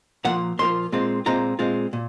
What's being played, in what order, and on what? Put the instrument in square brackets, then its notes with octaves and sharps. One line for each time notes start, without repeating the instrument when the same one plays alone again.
[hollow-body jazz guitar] A#2 F3 A#3 F4 F#5
A#2 F3 A#3 F4 C6
A#2 G#3 C4 F4
A#2 G#3 C4 F4 A#5
A#2 G#3 C4 F4
A#2